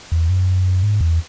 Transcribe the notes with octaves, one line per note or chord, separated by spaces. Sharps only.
E2
F#2
G#2
E2